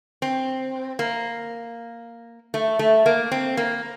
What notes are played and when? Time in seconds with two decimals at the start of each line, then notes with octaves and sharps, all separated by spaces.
0.22 C4
0.99 A#3
2.54 A3
2.79 A3
3.06 A#3
3.31 C4
3.57 A#3